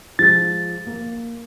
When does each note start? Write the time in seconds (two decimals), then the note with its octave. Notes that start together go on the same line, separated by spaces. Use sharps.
0.19 F3 G#3 A6
0.87 A#3